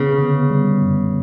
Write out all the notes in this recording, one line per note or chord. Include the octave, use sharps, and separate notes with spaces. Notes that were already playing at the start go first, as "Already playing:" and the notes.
Already playing: C#3 B3
D3
G3
F#2